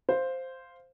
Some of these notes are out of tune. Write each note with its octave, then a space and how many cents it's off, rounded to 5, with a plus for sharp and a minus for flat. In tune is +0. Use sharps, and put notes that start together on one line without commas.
C5 +0 F5 +0